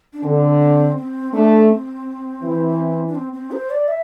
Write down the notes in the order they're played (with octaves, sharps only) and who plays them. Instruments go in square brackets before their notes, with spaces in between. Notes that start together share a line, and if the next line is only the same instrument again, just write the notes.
[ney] D4
[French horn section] D3 [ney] C4
[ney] C4
C4
[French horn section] A3 [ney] D4
[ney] C4
[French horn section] E3
[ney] D4
C4
C4
C5
D5
E5